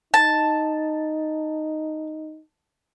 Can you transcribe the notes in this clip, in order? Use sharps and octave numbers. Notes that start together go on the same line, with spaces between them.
D#4 A5